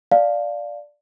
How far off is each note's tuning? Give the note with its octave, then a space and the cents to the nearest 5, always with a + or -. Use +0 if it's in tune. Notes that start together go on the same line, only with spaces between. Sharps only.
D5 +0 F5 +0 A5 -5